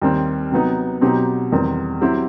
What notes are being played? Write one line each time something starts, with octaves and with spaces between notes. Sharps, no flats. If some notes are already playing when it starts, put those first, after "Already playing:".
D#2 D#3 G3 C4
C3 F#3 B3 D#4
B2 F#3 C4 D#4 G4
E2 D#3 G3 C4
F#3 C4 E4 G4